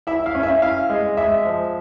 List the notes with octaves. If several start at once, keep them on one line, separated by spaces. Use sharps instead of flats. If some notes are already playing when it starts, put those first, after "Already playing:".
E4 E5
F5
C#4
E5
E4 F5
G#3
G#3 E5
F3